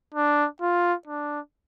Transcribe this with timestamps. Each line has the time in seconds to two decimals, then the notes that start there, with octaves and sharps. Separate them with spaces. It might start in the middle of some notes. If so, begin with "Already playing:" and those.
0.14 D4
0.61 F4
1.07 D4